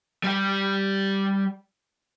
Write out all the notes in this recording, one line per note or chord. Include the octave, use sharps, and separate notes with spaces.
G3 G4